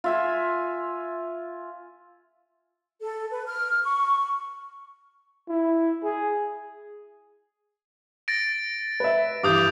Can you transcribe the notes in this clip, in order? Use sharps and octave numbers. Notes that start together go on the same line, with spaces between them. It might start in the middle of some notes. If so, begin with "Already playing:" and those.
F4 E5 G#5
A4
B4
F6
C#6
E4
G#4
A6 A#6 D7
B4 E5
G2 E3 D6 D#6 G6